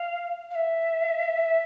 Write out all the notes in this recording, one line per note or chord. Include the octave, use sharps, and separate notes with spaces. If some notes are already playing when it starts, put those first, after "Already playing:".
Already playing: F5
F5
E5